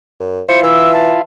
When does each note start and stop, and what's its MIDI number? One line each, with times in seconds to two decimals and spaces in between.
0.20 0.42 42
0.49 1.22 64
0.49 1.22 65
0.49 0.59 72
0.49 0.62 97
0.63 1.18 52
0.63 0.91 88
0.93 1.20 81